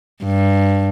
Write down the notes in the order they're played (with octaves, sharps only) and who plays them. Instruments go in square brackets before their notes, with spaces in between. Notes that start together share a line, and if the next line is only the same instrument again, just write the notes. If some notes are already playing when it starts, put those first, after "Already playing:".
[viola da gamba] G2